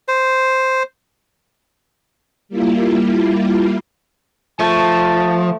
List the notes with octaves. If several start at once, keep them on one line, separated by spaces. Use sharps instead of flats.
C5
G3 A#3 E4 F4
F3 A3 A5